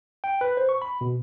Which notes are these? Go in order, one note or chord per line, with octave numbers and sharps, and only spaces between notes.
G5
B4
C5
C#6
B5
B2